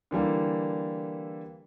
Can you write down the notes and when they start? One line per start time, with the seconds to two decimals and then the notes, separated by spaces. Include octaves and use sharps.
0.11 D3 E3 G3 A#3